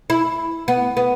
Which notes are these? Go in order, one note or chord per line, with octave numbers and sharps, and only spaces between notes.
E4
B3
B3